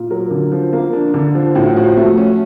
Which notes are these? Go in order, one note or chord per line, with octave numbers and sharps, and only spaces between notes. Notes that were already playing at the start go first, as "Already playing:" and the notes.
Already playing: A#2
F#3 A#4
D3
F3
A#3
D4
D3
F3
A2 F#4
F3 F#4
A3 F#4
C#4